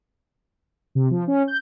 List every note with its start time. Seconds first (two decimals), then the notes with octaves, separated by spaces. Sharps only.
0.95 C3
1.11 F3
1.28 C#4
1.48 G6